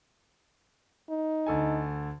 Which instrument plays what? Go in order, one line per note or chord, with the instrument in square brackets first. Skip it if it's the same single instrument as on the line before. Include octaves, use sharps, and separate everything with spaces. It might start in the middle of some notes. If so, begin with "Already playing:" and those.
[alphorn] D#4
[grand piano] D2 A4 G#5